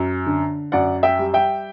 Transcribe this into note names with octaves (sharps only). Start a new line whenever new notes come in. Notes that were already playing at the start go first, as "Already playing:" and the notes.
Already playing: F#2
D3
F#2 D5 F#5
E5 G5
G3
E5 G5